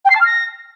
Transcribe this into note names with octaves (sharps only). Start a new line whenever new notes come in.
G5
C7
A5
F6
A#6